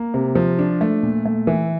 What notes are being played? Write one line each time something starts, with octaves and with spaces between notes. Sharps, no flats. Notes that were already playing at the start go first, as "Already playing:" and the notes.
Already playing: A#3
C3
F3
D4
A3
A#2
A3
E3